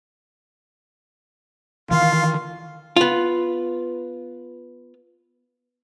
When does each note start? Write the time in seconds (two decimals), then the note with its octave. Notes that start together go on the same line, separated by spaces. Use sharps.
1.91 D#3 E3 F4 F5
2.96 B3 F4